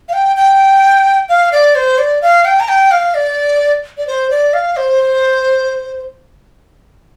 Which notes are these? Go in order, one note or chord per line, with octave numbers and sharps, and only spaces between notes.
F5
G5
G5
F5
D5
C5
D5
F5
G5
A#5
G5
F5
D5
D5
C5
D5
F5
C5